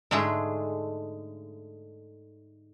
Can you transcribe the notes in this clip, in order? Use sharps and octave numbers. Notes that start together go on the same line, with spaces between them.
G#2 D3 G#3 A3 G#4